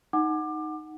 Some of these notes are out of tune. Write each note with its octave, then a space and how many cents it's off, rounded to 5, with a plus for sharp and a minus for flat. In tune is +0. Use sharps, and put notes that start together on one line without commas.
D#4 +0 F#5 +0 D6 +25